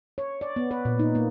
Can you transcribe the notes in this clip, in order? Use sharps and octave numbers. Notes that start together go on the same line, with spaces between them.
C#5
D5
B3
B4
A#2
D#4
A#3